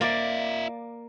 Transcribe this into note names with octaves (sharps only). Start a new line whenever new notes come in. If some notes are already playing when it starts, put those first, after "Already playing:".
A#3 F4 D5 E5